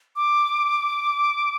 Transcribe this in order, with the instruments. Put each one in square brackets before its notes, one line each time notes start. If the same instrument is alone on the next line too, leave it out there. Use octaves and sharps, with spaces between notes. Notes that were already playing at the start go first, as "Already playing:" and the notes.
[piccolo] D6